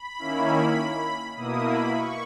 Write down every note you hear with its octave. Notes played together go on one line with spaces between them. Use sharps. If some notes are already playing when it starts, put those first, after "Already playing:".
Already playing: B5
D#3 A#3 C#4 E4
B2 A#3 E4 D#6
B5
C#6